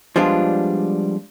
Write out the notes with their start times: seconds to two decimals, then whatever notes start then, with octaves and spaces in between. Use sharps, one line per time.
0.16 F3 G3 G#3 B3 D4 F4